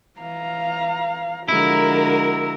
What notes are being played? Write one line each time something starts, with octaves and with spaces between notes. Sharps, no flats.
E3 F5 A#5
D3 F3 G#3 E4 F#4 A#4